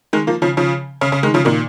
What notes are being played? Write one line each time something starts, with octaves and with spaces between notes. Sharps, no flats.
D#3 G#3
F3 A#3
C#3 F3
C#3 F3
C#3
C#3
D#3 G#3
C#3 F3
A#2 D#3